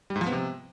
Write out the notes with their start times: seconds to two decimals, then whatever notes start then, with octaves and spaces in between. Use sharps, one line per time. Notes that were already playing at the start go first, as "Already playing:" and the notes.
0.10 G3
0.16 G#2
0.21 F3
0.26 B3
0.32 C3